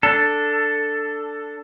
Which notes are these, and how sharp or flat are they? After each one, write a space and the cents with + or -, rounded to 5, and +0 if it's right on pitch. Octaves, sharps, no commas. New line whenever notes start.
D4 +0 A4 +10